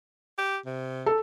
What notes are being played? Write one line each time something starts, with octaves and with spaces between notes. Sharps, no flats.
G4
C3
A4